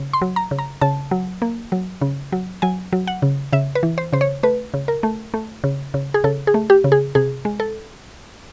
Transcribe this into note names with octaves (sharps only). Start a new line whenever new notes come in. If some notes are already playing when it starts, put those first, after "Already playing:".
Already playing: C#3
C6
F#3
A#5
C#3
A#5
C#3 A5
F#3
A#3
F#3
C#3
F#3
F#3 G#5
F#3
F#5
C#3
C#3 E5
B4
E3
C5
C#3 C5
C#5
A3 B4
C#3
A#4
A3
A3
C#3
C#3
G#4
C#3 A4
G#4
A3
G4
C#3
G#4
C3 G#4
G#3
A4